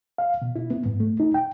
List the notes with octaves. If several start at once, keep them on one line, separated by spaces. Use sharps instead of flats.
F5
B2
E4
B3
G#2
A3
D#4
G5